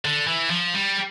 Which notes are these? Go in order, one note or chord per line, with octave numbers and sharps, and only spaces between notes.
D3
E3
F3
G3